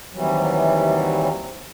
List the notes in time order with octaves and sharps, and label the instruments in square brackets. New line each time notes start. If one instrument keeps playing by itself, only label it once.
[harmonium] D#2 C3 E3 F#3 G3